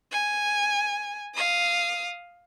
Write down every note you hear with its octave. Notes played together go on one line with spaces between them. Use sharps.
G#5
F5 D#6